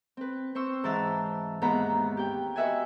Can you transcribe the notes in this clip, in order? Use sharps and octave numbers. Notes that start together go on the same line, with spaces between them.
C4 B4
C4 C5 C#6 E6
G#2 E3 E4 A5 A#5 E6
D#2 G#2 B3 A#5 B5
G4 G5
F#4 B4 D#5 E5 F#5 G#5